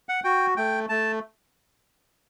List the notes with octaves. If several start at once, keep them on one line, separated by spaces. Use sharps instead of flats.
F#5
F#4 G5
A3 G5
A3 A5